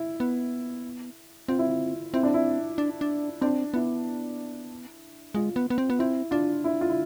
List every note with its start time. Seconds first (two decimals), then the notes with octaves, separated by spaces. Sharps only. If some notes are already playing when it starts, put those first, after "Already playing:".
Already playing: E4
0.20 B3
1.48 C4 F4
1.59 E4
1.69 F4
2.14 C4 E4
2.23 D4
2.34 E4
2.78 D4
3.01 D4
3.41 C4 D4
3.74 B3 E4
5.35 G#3 F4
5.56 B3
5.70 B3
5.78 C4
5.90 B3
5.99 C4 E4
6.31 D4 F4
6.64 E4
6.81 F4
6.89 E4